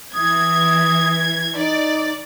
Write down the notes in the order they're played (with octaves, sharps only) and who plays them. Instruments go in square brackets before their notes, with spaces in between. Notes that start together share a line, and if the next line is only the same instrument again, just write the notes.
[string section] E3 G#6 [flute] D#6
[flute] D#4 [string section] D5